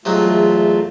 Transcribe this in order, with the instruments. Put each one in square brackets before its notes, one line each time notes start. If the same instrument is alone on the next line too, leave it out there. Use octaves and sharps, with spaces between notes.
[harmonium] E2 A3 F4 [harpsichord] C3 F#3 G#3